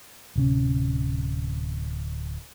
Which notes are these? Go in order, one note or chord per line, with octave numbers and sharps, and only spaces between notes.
D1 C3 C#4